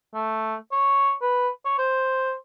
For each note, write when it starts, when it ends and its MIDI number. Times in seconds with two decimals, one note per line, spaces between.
0.14 0.55 57
0.72 1.13 73
1.22 1.49 71
1.66 1.77 73
1.79 2.34 72